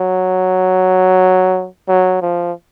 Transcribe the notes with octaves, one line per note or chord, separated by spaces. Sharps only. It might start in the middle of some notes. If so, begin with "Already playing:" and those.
Already playing: F#3
F#3
F3